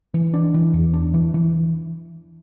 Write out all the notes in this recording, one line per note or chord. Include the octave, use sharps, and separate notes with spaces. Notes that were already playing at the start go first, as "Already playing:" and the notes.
E3
D4
E3
E2
D4
E3
E3